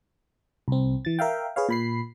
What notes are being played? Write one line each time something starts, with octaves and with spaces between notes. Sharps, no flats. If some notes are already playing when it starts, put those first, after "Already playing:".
C2 C4
E3 A6
A#4 E5 F5 G5
G#4 B4 C#5 F5
A#2 B5 C7